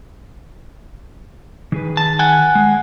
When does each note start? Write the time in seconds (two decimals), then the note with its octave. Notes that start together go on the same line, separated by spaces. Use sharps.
1.72 D#3 G#4 B4
1.97 A5
2.19 F#5 G#5
2.55 G#3